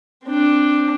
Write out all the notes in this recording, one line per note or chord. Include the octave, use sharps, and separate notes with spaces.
C4 D4